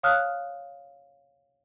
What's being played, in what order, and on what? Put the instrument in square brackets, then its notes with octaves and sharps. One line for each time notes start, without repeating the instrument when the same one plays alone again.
[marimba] C#5 F5 A5 D#6 F6 F#6